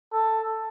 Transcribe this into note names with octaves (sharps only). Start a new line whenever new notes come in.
A4